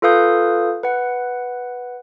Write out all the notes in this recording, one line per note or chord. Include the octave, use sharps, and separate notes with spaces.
F4 A4 B4 F5 D#6 G6
B4 F#5